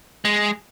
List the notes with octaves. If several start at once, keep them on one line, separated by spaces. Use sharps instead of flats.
G#3